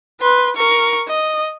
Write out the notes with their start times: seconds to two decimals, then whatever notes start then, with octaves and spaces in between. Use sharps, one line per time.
0.21 B4 C6
0.57 A#4 C#6
1.08 D#5